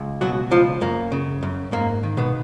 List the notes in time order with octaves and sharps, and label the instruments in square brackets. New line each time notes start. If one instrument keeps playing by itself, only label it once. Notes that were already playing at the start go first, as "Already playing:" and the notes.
Already playing: [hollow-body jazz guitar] C#2
B2 F#3 F#4
C#2 F3 F4
F#2 A#3
C#3
F#2
G#2 A#3
D#3
B2 B3